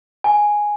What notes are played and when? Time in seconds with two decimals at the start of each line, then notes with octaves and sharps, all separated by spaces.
0.24 G#5